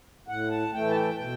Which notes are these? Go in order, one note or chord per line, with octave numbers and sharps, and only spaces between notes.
A2 F#5
A5
E3 A3 G5
A5
G5
B2